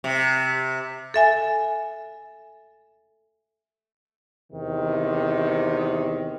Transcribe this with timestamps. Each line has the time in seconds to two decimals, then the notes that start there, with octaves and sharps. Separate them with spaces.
0.04 C3
1.14 A4 E5 G#5
4.53 E2 C3 D#3